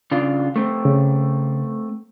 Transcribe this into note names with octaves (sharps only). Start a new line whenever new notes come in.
C#3 D4 F4
A3 C4
C#3